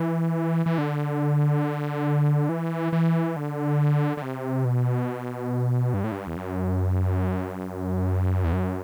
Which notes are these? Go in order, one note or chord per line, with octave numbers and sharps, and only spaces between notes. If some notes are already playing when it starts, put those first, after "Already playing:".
Already playing: E3
E3
D3
E3
E3
D3
D3
C3
B2
G2
A2
G2
E2
F#2
E2
F#2